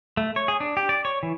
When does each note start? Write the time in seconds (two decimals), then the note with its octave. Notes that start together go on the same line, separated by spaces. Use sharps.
0.17 A3
0.36 C#5
0.48 G#4
0.60 D4
0.77 G4
0.89 D5
1.05 C#5
1.23 E3